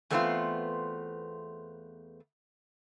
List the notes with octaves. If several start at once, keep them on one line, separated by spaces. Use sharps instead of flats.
E2 A3 B3 C4 E4 F4